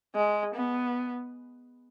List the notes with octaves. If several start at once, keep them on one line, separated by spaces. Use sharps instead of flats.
G#3
B3